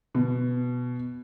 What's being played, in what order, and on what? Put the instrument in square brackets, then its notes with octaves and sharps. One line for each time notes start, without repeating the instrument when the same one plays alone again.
[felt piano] B2